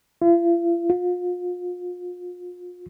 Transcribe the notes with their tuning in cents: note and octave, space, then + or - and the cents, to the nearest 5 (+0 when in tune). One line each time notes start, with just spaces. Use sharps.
F4 -45
F4 +35